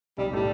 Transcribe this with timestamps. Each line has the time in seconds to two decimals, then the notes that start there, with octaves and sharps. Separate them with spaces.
0.18 B1 G3
0.33 A2 G3 A3 E4